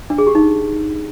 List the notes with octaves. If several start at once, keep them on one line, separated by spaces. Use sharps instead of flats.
D4
G#4
G4
D#4